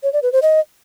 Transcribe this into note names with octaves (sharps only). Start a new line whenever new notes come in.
C#5
D5
B4
C5
D#5